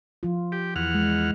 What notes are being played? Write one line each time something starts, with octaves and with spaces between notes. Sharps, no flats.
F3 F4
G4
E2 F#5 F6
G#3